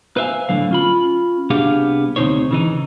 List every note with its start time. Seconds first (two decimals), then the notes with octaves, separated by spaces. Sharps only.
0.17 B4 C5 E5 F5 G#5
0.49 A2 D3 F#3 F5
0.71 C#4 F4 B5
1.50 C2 B3 D4 G4 G#4 F5
2.16 D2 C3 G#3 D#4 C5 C#5
2.51 C#3 E3 D#4